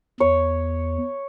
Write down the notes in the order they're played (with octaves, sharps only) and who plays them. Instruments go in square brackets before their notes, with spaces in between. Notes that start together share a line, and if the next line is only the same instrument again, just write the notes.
[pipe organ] E2 [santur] C#5